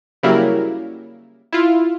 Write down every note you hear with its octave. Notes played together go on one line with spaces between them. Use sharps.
C#3 F#3 G3 A#3 E4 A#4
E4 F4